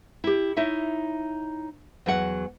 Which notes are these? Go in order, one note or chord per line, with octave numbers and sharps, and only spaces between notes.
E4 G4
D#4 E4 C#5 E5
E2 F#3 F#5